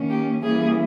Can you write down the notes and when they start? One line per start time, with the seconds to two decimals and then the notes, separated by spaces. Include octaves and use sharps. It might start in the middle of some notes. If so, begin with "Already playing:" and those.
Already playing: D#3 A#3 C#4
0.09 G4
0.42 E3 G3 A#3 C#4 G#4